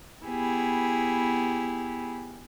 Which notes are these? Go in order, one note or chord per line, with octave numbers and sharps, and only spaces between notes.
B3 E4 G4 G#4